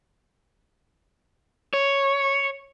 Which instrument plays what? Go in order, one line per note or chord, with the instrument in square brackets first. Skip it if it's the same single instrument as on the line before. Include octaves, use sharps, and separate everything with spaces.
[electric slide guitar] C#5